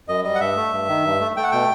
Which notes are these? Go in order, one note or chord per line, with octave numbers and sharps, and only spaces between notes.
F#2 D#5
G3 D#5
F#5
G2 E5
A3
G2
D#3
G2
A3
A3 G5
F#5
B2 G5